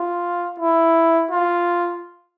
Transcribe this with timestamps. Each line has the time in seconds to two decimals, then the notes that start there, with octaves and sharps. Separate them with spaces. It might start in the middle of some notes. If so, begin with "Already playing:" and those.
Already playing: F4
0.60 E4
1.31 F4